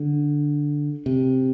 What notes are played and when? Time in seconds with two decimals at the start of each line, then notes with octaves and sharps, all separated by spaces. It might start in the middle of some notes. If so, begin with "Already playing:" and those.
Already playing: D3
1.06 C3